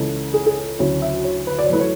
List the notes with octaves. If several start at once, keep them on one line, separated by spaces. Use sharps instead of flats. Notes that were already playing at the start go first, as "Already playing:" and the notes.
Already playing: C#2 C#3 E3 G#3 C#4 A4
G#4
G#4
A4
D2 C#3 F#3 C#4 E4 C#5
E5
C#5
B4
D5
C#5
F#2 E3 A3 E4 B4
C#5